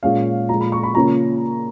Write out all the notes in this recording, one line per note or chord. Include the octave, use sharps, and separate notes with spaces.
A#2 G#3 C#4 F5
A#2 F3 G#3 A#5
B5
C#6
B5
C#3 F3 A#3 C#4 A#5